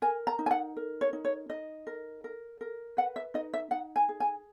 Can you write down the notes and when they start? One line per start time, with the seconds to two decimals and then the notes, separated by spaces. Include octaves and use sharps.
0.02 A#4 G#5
0.27 A#5
0.39 D#4
0.46 G#5
0.51 F#5
0.76 A#4
1.01 C#5
1.13 D#4
1.25 C#5
1.49 D#4 D#5
1.87 A#4
2.24 A#4
2.61 A#4
2.97 B4 F#5
3.16 E5
3.34 D#4 D#5
3.53 E5
3.71 D#4 F#5
3.96 G#5
4.09 G#4
4.20 G#5